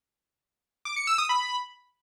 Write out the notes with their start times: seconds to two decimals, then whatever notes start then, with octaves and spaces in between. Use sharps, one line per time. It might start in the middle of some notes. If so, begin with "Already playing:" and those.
0.85 D6
0.96 C#7
1.07 E6
1.18 D#6
1.29 B5